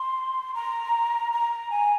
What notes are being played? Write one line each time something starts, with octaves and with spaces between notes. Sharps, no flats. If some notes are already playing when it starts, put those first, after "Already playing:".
Already playing: C6
A#5
A#5
G#5